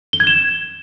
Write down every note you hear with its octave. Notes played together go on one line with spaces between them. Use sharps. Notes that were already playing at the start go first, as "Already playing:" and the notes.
G7
G#6
E7